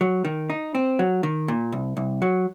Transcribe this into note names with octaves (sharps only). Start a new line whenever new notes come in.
F#3
D#3
D#4
C4
F#3
D#3
A#2
C2
C2
F#3